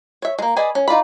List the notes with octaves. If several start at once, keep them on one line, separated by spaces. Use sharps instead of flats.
C#5 E5
G#3 A#3
G#4 B4 D5 D#5 G#5
C#4
D#4 F4 D5 B5